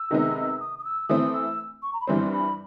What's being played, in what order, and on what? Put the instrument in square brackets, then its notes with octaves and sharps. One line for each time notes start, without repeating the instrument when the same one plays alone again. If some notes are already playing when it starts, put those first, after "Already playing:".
Already playing: [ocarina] E6
[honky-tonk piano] C3 D#3 G#3 B3 D#4
[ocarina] D#6
D#6
E6
[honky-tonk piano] E3 A3 C4 [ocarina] D#6
[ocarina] E6
C#6
A#5
B5
[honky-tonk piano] G2 E3 G3 C4 [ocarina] C6
[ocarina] B5